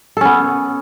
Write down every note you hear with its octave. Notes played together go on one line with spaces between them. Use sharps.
B3 C#4 A4